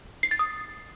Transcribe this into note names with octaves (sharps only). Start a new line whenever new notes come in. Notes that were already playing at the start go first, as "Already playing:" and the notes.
C7
A6
D#6